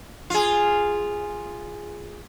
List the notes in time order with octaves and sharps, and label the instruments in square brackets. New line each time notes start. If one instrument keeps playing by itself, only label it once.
[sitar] F4 G#4